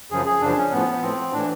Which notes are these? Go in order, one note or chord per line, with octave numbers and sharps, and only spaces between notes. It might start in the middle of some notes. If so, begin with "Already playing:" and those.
F#2 C#3 F3 G#4
G#4
F#2 C#3 F3 D4
C#4
A2 F3 B3
A2 F3 C4
A2 E3 D4